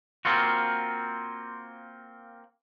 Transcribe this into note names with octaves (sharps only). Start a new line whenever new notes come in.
A#3 C4 F4 F#4